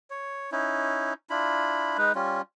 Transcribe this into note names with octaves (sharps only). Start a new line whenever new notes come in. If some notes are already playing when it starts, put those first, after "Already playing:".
C#5
C#4 D#4 E4
D4 E4 F4 B5
G#3 D#4 B4
G3 C#4 F4